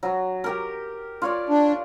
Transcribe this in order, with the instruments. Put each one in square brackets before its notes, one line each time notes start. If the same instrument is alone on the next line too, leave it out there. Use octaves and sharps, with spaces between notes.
[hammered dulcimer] F#3
G4 A#4
F4 C#5 D5
[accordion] D4